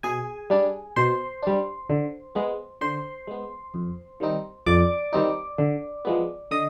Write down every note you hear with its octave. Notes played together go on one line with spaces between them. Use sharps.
B2 G#4 G#5
G3 D4
B2 C5 C6
G3 D4
D3
G#3 B3
D3 C5 C6
G#3 B3
F2
D#3 G3 C4 D#4
F2 D5 D6
D#3 G3 C4 D#4
D3
F3 G#3 B3
D3 D#5 D#6